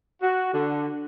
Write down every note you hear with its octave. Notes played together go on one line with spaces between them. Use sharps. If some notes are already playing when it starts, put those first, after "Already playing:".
F#4
D3